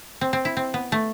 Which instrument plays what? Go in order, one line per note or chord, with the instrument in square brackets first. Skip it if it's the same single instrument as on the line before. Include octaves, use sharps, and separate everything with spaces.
[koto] C4
C4
E4
C4
B3
A3